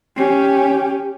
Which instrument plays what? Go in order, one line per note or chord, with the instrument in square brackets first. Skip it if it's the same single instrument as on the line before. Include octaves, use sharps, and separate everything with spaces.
[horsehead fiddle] C#4 G4